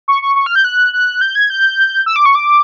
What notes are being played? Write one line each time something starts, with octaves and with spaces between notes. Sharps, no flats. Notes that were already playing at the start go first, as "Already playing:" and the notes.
C#6
C#6
C#6
F6
G6
F#6
F#6
G6
G#6
G6
E6
D6
C#6
D6